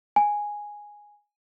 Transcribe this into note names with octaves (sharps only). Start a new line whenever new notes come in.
G#5